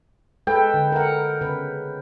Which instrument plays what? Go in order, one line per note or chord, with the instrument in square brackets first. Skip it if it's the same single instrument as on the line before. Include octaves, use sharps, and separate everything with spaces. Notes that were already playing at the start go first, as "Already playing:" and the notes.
[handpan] G#3 A4 B4 [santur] G5
[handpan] D3
A#4 F#5
C#3 B4